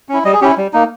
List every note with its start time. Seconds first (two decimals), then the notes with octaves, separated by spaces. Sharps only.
0.09 C#4 E4
0.25 G3 D#5
0.33 G#4
0.41 C#4 E4 G4
0.57 G3
0.73 A#3 D#4